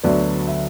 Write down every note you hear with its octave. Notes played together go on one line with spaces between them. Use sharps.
D2 D3 F#3 B3 D5
E5